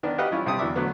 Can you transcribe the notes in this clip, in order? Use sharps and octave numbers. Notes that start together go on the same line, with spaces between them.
D#3 B3 D4
F#4 G4 B4 D#5 F5 F#5
E3 G3 C#4 E4 F4
G2 C3 C4 G4 A5 D#6
E2 E3 F#3 D4 E5 D6
D3 F#3 A3 B3